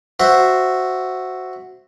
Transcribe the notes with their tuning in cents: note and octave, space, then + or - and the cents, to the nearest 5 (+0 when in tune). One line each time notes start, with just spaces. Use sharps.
F#4 +0 C5 +0 E5 +0